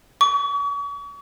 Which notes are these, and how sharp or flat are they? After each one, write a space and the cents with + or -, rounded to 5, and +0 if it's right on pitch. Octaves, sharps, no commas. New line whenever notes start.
C#6 +40